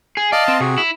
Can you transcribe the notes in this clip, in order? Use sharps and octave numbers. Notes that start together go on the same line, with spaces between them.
G#4
D5 D#5 F5 A5
C4
C3 F#4 G#4
E4